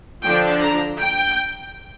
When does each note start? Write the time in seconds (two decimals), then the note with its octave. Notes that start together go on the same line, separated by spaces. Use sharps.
0.22 D3 F3 D4 G5
0.61 A#5
0.99 G5